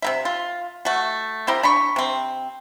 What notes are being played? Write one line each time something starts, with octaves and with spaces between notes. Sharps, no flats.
C3 A#3 E5
F4
A3 F#4
C4 E4 G4 A#4
D4 B5 C#6
C3 C4